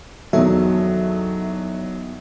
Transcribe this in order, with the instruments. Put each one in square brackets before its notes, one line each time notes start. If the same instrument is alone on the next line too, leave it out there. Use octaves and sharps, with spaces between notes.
[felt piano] E2 B2 D#3 [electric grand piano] F#3 [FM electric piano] A4 E5